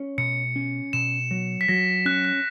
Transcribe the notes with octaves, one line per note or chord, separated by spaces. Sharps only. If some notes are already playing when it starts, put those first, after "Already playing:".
Already playing: C#4
B2 C#7
C#4
B2 E7
F#3
B6
F#3 A#6
C#4 F#6
F#6